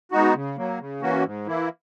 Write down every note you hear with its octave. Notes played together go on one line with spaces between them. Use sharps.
G#3 B3 D#4 F#4
C#3
F#3 A#3
C#3
E3 A#3 C#4 F#4
G#2
E3 A#3 E4